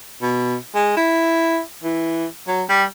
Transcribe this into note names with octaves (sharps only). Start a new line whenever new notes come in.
B2
G#3
E4
E3
F#3
G3